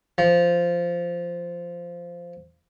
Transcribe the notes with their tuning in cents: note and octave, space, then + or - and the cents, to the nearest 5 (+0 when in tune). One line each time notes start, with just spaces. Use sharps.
F3 -10